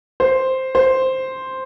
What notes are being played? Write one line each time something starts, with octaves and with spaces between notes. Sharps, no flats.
C5
C5